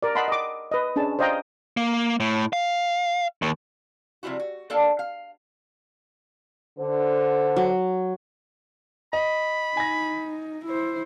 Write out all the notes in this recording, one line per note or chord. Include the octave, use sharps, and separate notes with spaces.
A#4 D5
D#5 F#5 A5 B5 C6
D#5 D6
B4 D#5
C#4 D4 G#4 A5
C5 D5 D#5 F5 G5 A#5
A#3
A2
F5
D#2
C3 F3 G3 E4 F#4
F#4
A#3 D4 A4 D5 F5 A5
F5
D3 C5
F#3
D#5 B5
D#4 G#5 A#6
E4 C5